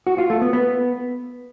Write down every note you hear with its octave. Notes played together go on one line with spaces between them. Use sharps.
F#4
F4
A3
B3
B3